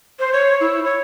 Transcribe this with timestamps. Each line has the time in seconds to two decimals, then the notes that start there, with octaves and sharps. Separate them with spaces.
0.20 C5
0.33 C#5
0.60 E4
0.84 C#5